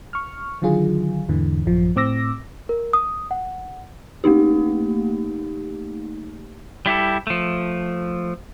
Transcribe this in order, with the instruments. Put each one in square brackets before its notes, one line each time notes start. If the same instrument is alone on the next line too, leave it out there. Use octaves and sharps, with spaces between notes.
[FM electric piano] C#6 F6
D3 D#3 F#3 F4 G#4
E2 G#2 D3 E3
A1 F#2 F3
A2 C4 D6 E6 A#6
[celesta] A#4
D#6
F#5
[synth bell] A3 A#3 D#4 G4
[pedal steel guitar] G3 E4 G4 A4
F3 A3